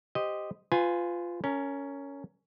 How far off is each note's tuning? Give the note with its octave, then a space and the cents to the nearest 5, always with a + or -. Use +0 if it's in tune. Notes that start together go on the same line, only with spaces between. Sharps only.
G4 +0 C5 +0 D#5 +0
F4 +0 B4 +35 G#5 +0
C#4 +10 A#4 -20